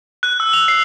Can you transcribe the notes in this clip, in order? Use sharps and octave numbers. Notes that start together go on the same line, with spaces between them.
F#6
E6
F7
C7